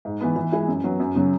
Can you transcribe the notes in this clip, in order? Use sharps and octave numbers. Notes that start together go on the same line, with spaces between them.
G#2
E3 B3
E3
G#3 E4
F#2
F#3 B3
F#2
C#3 F#3